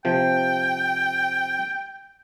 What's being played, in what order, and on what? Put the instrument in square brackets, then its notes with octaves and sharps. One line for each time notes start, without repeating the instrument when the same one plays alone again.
[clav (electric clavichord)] C3 F3 [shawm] G5